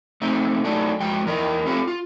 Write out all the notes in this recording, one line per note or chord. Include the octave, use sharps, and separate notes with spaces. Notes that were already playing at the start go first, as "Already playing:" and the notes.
A3 C4 D#4
F#3 A3 D4 D#4
F2 G#3 F#4 G5
E2 E3 A#4 D#5
C4 F4 G4 A4
F4